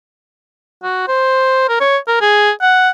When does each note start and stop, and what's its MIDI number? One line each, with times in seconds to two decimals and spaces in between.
0.83 1.04 66
1.08 1.67 72
1.69 1.79 70
1.80 1.97 73
2.08 2.18 70
2.21 2.51 68
2.62 2.90 78